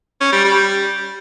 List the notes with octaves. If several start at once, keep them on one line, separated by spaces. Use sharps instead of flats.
C#4
G3
G3